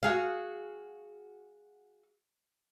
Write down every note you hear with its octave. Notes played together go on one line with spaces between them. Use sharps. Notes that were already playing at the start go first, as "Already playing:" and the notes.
F#4 G#4 F5